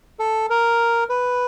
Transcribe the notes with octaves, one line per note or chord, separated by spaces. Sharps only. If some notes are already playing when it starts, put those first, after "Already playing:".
A4
A#4
B4